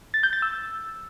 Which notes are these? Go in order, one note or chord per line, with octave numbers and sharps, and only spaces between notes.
A6
G6
A6
E6